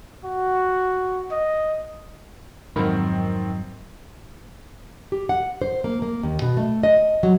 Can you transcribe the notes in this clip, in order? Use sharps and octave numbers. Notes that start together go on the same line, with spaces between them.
F#4
D#5
F2 G#2 D#3 F#3 G#3 C4 A#4 B5
G4
F#5
C5
A#3
A#3
D#2
B2
A3
D#5
F#3